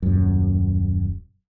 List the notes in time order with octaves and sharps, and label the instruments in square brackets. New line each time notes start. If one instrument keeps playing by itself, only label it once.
[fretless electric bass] D#1 F#2